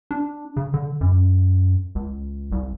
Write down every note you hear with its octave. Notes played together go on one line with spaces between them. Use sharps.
D4
C#3
D3
F#2
C#2
C2